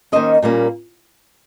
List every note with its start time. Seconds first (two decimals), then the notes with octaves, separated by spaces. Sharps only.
0.12 D#3 A#3 C#4 C5 D#5
0.42 A#2 G3 A#3 C#4